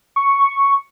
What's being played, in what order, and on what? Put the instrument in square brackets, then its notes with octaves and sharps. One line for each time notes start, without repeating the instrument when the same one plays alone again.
[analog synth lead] C#6